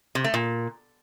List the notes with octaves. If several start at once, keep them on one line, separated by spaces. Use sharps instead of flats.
C3
A3
A#2